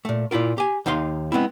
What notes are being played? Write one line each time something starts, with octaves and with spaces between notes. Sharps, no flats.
A#2 A3
A#2 E4 F4 A#4
G4 G#5
D#2 D#4 F5 C6
G#3 B3 C4 E4